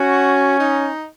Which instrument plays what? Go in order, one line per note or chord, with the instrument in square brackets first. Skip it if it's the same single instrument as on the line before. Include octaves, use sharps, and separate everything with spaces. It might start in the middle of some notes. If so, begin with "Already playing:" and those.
Already playing: [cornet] C#4 [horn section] F#4
[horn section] D#4